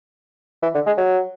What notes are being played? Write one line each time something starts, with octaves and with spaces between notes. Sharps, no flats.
E3
D3
G#3
F#3